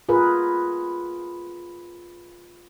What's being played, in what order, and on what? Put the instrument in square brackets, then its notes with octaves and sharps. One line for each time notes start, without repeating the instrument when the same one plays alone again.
[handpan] F4 G#4 A#4 B4